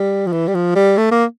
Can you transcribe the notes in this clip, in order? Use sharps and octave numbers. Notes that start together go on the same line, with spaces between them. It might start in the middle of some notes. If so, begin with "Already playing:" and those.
Already playing: G3
F3
E3
G3
F3
G3
A3
A#3